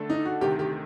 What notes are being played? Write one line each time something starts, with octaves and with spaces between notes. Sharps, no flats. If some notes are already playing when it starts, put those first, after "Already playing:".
Already playing: D3 A3 D4 A4
D#4
F#4
D2 C3 D#3 G4
G4